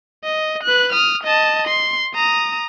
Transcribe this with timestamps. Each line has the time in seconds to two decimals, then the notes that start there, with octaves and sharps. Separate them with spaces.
0.25 D#5
0.64 B4 F#6
0.93 D#6 F6
1.24 D#5 A5
1.68 C6
2.15 A#5 D#6